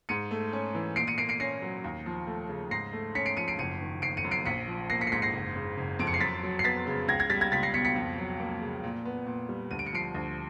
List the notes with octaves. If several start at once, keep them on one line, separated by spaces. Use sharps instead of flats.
G#2 C#7 D#7
A3
C#4
E3
A#2 C7 D7
C#7 D#7
A#3 C7 D7
C7 D7
C#4 A#6 C7
F#3
D#2
F3
A3
C#3
G#2 A#6 C7
A3
C#4 B6 C#7
C7 D7
F3 C#7 D#7
C7 D7
F#1 C#7 D#7
D#3
F#1 C7 D7
C#7 D#7
F#2
C7 D7
A#1 B6 C#7
F3
A#3 A#6 C7
B6 C#7
C7
G#2 B6 C#7
A#6 C7
F#1
C#3
F#1
F2 D7
C#7
C7
F#2 A6 B6
F#3
C7
B3 A6 B6
C#3
C#2 G#6 A#6
G#6 A#6
G3 A6 B6
G#6 A#6
C#2 A6 B6
A#6 C7
B2 B6 C#7
B6 C#7
F2
F#3
A#3
C#3
A#2
B3
A#2
G3
D2 D#7
D7
C#7
F3 C7 D7
D2